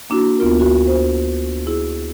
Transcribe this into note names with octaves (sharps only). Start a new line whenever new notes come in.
A#3 D4 E4 F#4
D2 B3 F4 A#4
F#4
C5
E4 G#4